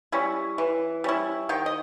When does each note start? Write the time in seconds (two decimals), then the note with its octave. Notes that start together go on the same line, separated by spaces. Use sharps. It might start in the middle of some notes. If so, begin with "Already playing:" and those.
0.12 G3 C#4 E4
0.58 E3
1.04 G3 C#4 E4
1.49 D#3 G5
1.66 D#5